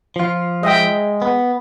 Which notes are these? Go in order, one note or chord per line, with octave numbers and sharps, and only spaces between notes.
F3 F4
G#3 D#5 E5 G5
B3